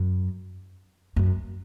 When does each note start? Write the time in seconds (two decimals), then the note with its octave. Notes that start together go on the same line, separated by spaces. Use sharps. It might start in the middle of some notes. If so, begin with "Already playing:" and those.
Already playing: F#2
1.16 F#2